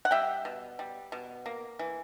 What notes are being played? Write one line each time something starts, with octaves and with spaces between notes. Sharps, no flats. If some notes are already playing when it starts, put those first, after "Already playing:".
F#5
G3 E5 G5
B2
G3
B2
A#3
E3